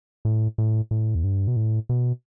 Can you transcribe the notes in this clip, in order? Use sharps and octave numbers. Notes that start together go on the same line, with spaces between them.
A2
A2
A2
E2
G2
B2
A2
B2